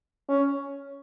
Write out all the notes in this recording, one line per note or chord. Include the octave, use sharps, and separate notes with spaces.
C#4